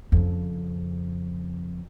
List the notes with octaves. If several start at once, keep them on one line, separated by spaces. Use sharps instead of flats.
F2 C#3